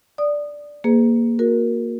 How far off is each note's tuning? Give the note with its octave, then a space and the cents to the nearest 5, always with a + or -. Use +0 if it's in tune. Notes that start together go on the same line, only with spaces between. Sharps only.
D5 +0 D#6 -15
A#3 +0 G#4 +0 B4 +40
F#4 -25 A#4 +0